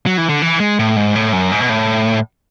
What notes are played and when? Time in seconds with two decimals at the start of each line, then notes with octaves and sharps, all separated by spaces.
0.06 F#3
0.18 E3
0.29 D3
0.42 E3
0.60 G#3
0.79 A2
0.96 G#2
1.15 A2
1.33 F#2
1.52 G#2
1.61 B2
1.69 A2